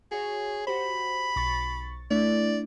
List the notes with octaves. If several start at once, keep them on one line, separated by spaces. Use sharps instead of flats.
F#4 G#4 C#5
F#4 G4 C5 B5
B1 C#6 A6
A3 D4 E4 D5